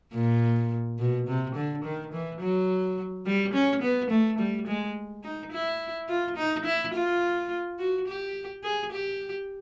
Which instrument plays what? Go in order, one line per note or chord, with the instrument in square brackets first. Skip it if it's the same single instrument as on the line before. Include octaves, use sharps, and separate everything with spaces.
[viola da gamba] A#2
B2
C3
D3
D#3
E3
F#3
G3
C#4
B3
A3
G3
G#3
D#4
E4
F4
D#4
E4
F4
F#4
G4
G#4
G4